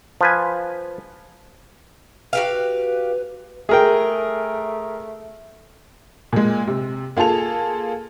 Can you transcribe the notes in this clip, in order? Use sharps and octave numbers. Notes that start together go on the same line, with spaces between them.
F3 B4 G#5
F#4 G4 B4 F5
A3 G#4 A#4 G5
A#2 G#3
C3
A#3 F4 G#4 A4 F7